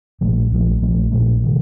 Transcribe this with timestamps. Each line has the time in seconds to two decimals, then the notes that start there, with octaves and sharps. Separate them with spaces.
0.21 A#1 A#2 F3 A3
0.51 A#1 A#2 F3 A3
0.81 A#1 A#2 F3 A3
1.12 A#1 A#2 F3 A3
1.43 C3 D#3 G3